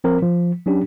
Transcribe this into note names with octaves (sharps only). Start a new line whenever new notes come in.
F3 C4 A#4
F3
F#3 C#4 D4 G4